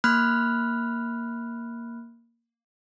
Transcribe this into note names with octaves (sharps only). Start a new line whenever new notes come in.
A#3 B5 F6 F#6